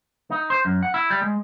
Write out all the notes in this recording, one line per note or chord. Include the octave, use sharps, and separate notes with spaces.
D#4
C5
F#2
F#5
E4
G3
G#3